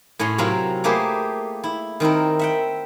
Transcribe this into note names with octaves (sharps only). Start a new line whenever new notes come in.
A2 C#4 C#5 F#5 C6
C3 F#3 C4 F4 A#4
A3 A#3 G4 G#4 B4 C5
E4
D#3 C4 E4 A#4
E5 F#5 G5